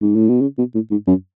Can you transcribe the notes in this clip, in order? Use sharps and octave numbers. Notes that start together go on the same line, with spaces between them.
G#2
A2
B2
C#3
B2
A2
G#2
F#2